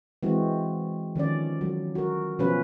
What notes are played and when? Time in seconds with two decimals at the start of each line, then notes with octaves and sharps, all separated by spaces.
0.23 E3 G#3 C4 F#4
1.16 D#3 F3 C#4 D5
1.61 F#3
1.95 F#4 A#4
2.39 B2 F3 C#4 B4